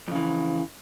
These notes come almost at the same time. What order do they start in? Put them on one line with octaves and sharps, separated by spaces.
F2 C#3 E3